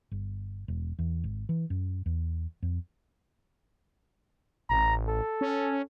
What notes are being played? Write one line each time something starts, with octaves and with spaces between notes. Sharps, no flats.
G1
E1
E2
G#1
E3
F#2
E2
F2
A1 A#5
A4
C#4